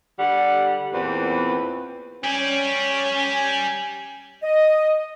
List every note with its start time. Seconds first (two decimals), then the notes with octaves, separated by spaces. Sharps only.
0.19 D3 G3 F#5
0.92 E2 A#2 B3 C4
2.24 C#4 G4 D5 G#5
4.43 D#5